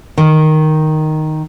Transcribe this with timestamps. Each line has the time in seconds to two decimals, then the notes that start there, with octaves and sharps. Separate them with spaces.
0.18 D#3